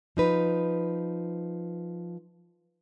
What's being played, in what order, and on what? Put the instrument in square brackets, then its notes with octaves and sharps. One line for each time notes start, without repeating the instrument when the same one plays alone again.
[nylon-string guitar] F3 D#4 B4